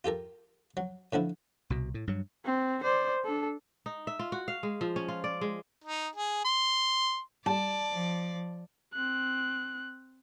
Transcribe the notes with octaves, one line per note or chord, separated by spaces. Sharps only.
F4 G4 A4 A#4
F#3
A2 D3 F3 E4
C2 B2
A2
G2 F#3
C4
C5 D5
D4 A4
D#4
E5
F4
F#4
F5
G#3
F3
C#4
F4
D5
G#3
D#4
G#4
C6
G3 D5 A5
F3
C4 F#6